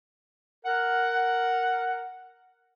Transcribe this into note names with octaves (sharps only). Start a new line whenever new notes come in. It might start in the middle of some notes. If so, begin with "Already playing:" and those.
A#4 F#5